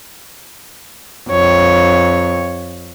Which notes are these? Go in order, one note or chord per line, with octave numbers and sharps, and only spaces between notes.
F2 C#5